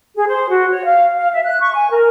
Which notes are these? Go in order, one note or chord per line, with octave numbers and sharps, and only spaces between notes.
G#4
C5
F#4
C#5
F5
F5
E5
F#6
C#6
G#5
A#4